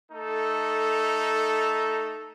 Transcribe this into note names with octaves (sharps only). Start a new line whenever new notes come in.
A3 D#4 A4